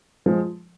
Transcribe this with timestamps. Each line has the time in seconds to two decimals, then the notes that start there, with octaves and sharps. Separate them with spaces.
0.26 F3 G#3